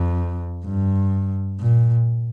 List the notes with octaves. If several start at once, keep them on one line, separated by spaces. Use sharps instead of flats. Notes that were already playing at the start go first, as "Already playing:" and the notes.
Already playing: F2
G2
A#2